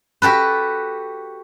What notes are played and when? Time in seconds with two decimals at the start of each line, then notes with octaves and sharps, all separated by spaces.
0.22 F#4 G4 A4 B4